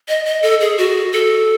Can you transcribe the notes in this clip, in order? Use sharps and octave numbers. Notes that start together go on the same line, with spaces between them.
D#5
D#5
A4
G#4
F#4
A4